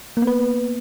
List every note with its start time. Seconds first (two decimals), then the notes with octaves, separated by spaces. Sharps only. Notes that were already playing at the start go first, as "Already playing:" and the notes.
0.17 A#3
0.22 B3
0.27 B4